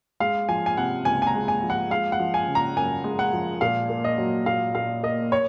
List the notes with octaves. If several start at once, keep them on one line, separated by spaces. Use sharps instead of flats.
G#3 F5
F3 G#5
G#5
C3 F#5
C#2 G#5
G#5
A#5
G#3
G#5
F3
F#5
G#3 F5
F#5
F3
G#5
C#3
A#5
F#2 G#5
G#3
F#5
F3
A#2 F5
A#3
D#5
F#3
A#2 F5
A#2 F5
A#3 D#5
C#5